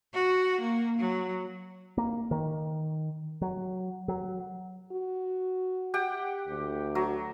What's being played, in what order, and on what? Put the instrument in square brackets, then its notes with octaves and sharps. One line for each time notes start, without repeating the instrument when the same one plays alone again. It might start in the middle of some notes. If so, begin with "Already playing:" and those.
[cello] F#4
A#3
F#3
[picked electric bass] A#3
D#3
F#3
F#3
[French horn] F#4
[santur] G4 F#5 G5
[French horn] D2
[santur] F#3